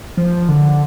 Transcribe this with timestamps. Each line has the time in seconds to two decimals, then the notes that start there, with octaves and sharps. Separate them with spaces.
0.17 F3
0.49 D3